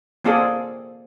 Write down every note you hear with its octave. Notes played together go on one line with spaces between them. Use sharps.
A#3 C4 F4 G#4 A4 D5